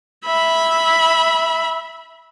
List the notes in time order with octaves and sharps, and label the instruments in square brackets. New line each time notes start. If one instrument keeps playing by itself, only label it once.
[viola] E5 B5